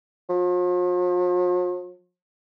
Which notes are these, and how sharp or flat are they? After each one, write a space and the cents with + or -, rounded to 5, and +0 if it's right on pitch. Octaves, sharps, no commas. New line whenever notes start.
F3 +45